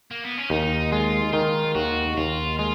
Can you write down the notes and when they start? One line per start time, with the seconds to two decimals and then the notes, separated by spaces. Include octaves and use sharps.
0.11 A#3
0.24 B3
0.38 C#4
0.50 D#2 D#4
0.92 G#3 F4
1.33 D#3 F4
1.75 D#2 F#4
2.17 D#2 F4
2.59 G#3 F4